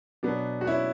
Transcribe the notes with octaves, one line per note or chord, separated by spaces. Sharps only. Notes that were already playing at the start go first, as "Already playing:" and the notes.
B2 F#3 B3 D4
F#4
C#4 E4